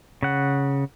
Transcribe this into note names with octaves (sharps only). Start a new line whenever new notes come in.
C#3 F#5